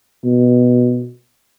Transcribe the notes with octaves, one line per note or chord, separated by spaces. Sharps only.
B2